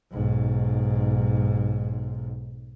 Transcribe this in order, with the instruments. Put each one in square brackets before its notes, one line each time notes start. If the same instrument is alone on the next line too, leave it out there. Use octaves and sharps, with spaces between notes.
[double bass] B1 G#2